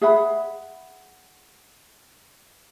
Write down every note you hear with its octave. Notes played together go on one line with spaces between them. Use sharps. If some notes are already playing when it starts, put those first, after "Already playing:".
G#4 E5 F#5 B5